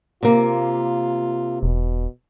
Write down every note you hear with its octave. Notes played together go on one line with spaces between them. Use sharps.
C3 A#3 F4
E1 B2